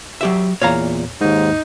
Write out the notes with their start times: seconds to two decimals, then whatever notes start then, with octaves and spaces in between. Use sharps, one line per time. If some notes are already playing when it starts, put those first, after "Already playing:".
0.21 F#3 G4 E5
0.61 E2 A#2 C#5 F5 A#5
1.21 D#2 G#2 D#4